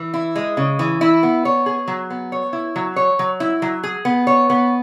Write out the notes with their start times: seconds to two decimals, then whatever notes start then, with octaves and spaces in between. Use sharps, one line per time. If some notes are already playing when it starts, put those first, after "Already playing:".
Already playing: E3
0.14 E4
0.36 G#3
0.57 C#3
0.79 E3
1.01 E4
1.23 B3
1.45 C#5
1.66 G#4
1.88 F#3
2.10 B3
2.32 C#5
2.53 E4
2.76 F#3
2.96 C#5
3.19 F#3
3.40 E4
3.62 F#3
3.83 G#4
4.05 B3
4.27 C#5
4.50 B3